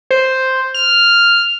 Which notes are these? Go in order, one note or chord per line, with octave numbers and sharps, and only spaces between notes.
C5
F6